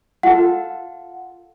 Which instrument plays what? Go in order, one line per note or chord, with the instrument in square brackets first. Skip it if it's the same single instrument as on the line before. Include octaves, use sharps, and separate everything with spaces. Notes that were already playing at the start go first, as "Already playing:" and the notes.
[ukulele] F4 A4 [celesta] F#5